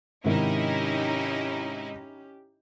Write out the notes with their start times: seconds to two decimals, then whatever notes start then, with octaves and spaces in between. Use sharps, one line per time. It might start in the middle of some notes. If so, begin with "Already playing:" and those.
0.24 G#2 C3 D#3 C#4 D#4 E4 G4